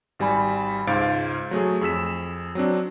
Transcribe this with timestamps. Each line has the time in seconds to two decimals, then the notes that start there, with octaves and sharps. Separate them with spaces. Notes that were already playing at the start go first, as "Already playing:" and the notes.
0.19 G#1 G3 G#5 B5
0.87 C#2 G#2 C5 F5 A6 D7
1.51 F#3 A3 G#4
1.81 F2 G#4 E6 B6 E7
2.55 F#3 C4 D4